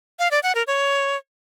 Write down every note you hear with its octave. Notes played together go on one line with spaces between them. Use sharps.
F5
D5
F#5
A#4
C#5